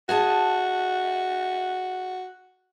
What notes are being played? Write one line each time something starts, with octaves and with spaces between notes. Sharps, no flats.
F#4 G#4 D#5 A5